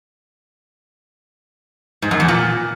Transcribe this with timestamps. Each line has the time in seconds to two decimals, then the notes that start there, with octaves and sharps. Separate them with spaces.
2.02 G#2
2.11 F#2
2.20 E2
2.28 A#2